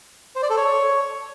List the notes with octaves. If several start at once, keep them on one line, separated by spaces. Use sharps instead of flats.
C5
D5
A4
C#5